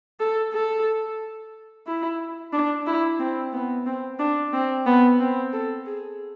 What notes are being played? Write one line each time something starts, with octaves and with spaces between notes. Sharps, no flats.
A4
A4
E4
D4
E4
C4
B3
C4
D4
C4
B3
C4
A4
G#4